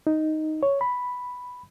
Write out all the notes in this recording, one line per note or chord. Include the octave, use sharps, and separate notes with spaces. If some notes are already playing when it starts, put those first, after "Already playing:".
D#4
C#5
B5